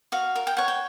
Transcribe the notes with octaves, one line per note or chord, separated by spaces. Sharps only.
F#4 F5
A#4
G5
C#5 F#5
G5